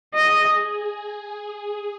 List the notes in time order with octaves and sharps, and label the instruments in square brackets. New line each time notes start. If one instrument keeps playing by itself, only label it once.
[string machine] G#4 [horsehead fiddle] D#5